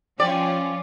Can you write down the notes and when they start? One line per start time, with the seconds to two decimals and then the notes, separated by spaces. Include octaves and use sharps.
0.20 F3 C#4 F4 D5 G5